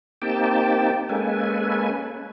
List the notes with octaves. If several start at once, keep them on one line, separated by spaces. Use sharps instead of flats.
A#3 C4 D#4 G4 G5 A5
G#3 A#3 C#4 A4 B4 G#5